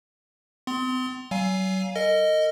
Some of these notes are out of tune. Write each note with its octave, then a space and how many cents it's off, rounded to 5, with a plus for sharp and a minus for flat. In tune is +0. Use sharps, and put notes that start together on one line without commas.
C4 -45 C6 +0
F#3 +40 F5 +5 G#5 +0
A#4 -40 D#5 +0